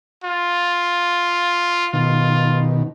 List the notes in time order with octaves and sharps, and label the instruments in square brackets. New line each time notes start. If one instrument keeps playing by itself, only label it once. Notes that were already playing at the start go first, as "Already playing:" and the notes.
[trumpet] F4
[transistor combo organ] B2 D#3 [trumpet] F4